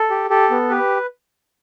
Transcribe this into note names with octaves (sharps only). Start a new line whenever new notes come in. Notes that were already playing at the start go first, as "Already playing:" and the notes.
Already playing: A4
G4
G4 A4
B3
G4 B4